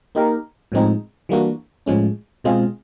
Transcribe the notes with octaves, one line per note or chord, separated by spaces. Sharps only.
A#3 D#4 G4 A#4
A2 F3 G#3 C4 D#4
E3 G3 A#3 D4 F#4
A2 F3 G#3 C#4
B2 G#3 C4 F4 G#4